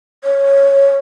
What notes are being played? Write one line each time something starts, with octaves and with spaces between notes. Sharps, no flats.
C#5